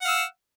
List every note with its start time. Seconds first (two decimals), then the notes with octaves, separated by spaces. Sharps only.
0.02 F#5
0.05 F5
0.08 E6